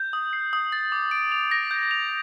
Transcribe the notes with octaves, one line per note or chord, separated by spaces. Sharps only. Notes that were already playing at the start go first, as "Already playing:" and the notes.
Already playing: G6
D#6
C7
D#6
A6
D6
D7
F7
A#6
G6
F7